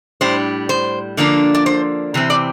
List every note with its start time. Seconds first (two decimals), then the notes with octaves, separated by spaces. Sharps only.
0.21 A2 G3 D4 C5
0.69 C5
1.17 D3 F3 A#3 D4
1.55 D5
1.66 C5
2.14 C3 E3 C4
2.30 D5